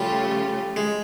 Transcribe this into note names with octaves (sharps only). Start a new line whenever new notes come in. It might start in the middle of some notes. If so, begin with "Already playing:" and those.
Already playing: C#3 F3 G3 A3 C#4 F4
G#3